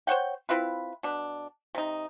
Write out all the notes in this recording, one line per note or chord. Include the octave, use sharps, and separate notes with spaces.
C5 C#5 F#5 G5
C4 E4 F4 B4
B2 D4
C3 D#4